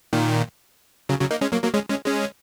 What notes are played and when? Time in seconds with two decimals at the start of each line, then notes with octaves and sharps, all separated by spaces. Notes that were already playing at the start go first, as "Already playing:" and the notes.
0.13 A#2 D#3
1.09 C#3 F#3
1.20 C#3 F#3
1.31 A#3 D#4
1.41 G#3 C#4
1.52 F#3 A#3
1.63 F#3 A#3
1.74 G#3 C#4
1.89 G#3 C#4
2.06 G#3 C#4